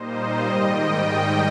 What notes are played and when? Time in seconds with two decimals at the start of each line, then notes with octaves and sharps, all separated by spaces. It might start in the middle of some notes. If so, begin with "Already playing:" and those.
Already playing: A#2 G3 A#3 D#4 C5 D#5
0.46 G#2 D#3 G3 D#5 G5